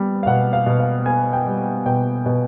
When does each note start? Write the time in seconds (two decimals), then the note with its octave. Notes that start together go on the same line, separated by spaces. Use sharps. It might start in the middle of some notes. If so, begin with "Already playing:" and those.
Already playing: G3 B3
0.23 F5
0.26 B2 F#5
0.53 F5
0.66 B2
0.80 F5
1.06 B3 G#5
1.33 G5
1.46 G3
1.86 B2 G5
2.26 B2